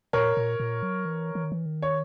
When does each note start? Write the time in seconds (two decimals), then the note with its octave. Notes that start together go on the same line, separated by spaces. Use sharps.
0.13 A#2 A#4 C#5
0.37 A#2
0.60 A#2
0.83 F#3
1.05 E3
1.35 E3
1.44 D#3
1.52 E3
1.66 D#3
1.82 C#5